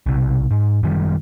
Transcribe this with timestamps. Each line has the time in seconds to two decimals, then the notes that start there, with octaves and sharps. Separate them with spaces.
0.06 B1 C3
0.51 G#2
0.83 F#2 D#3 G3